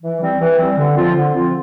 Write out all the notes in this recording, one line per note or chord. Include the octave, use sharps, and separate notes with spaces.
E3
G3 C4
E3
G3 C4
D3
F3 C4 F4
D3
F3 C4 F4